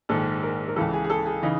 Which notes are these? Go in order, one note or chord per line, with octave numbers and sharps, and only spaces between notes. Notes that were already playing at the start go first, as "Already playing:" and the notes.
A#1 G#2 D#3 A4
A#4
A#4
C#2 C#3 E3 A4
G#4
G#4
A4
G#4
C#3 E3 D#4